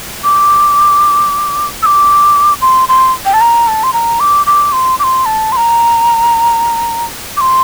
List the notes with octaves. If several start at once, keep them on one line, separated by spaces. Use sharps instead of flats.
D6
E6
D6
C6
C6
G5
A5
A#5
A5
C6
A#5
D6
D6
C6
D6
C6
A5
C6
A#5
D6
C6